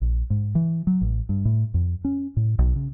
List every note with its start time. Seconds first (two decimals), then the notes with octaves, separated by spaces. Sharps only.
0.02 A#1
0.30 G#2
0.55 E3
0.87 F#3
1.01 A1
1.29 G2
1.45 A2
1.74 F2
2.05 C#4
2.37 A2
2.59 B1
2.76 C#3